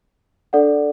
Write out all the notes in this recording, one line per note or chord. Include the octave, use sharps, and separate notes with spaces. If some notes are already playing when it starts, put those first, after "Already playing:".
D4 A4 D5 F#5